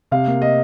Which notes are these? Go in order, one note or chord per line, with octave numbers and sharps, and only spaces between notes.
C3 F5
A#3
D#5